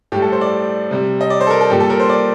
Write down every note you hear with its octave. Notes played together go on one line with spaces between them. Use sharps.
A2 G3 G4
A4
C5
D5
C3 G3
D#5
D5
C5
A4
A#4
A4
A#2 G3 G4
A4
A#4
C5
D5